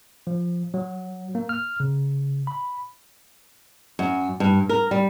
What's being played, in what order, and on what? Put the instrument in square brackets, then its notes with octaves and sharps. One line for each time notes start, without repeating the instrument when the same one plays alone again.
[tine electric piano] F3
F#3
A#3
F6
C#3
B5
[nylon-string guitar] F#2
G2
A#4
G3